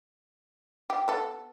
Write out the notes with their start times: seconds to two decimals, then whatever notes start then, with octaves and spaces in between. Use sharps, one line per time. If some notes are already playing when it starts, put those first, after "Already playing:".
0.90 G4
1.08 B3 A4